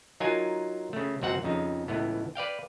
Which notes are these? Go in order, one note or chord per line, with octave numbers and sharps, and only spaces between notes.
F#3 D#4 F4 A#4 G#5
C#3 A3
C#2 F#2 C4 F#4 F#5
F2 C#3 D#4
C#2 A2 E3 B3
B4 D5 F5 G5